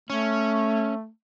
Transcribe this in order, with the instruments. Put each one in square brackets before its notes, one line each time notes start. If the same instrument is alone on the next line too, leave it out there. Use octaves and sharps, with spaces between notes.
[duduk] A3 [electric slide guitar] C#4